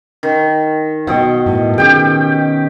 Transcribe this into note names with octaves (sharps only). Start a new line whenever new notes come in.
D#3
B2 D#5 F#5 G5
A2
D#3 C#4 G4 G#4 G5